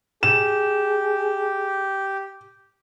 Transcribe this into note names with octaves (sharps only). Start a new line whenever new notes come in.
G4 G#4 E7